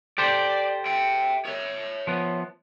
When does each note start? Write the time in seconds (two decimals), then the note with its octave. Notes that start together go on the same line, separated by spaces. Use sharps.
0.18 G4 A4 C5 D5
0.86 E5 G5
1.46 C#5 E5
2.07 F3 B3